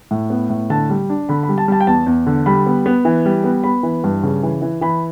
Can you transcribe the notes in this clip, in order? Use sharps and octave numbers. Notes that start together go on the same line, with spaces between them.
A2
B3
A2
D3 A5
G3
D4
D3 B5
B5
G3
A5
G3 A5
G5
E2 A5
E2
D3
G3 B5
B3
B3
E3
G3
B3
B3 B5
E3
G2
C#3
E3
E3
E3 B5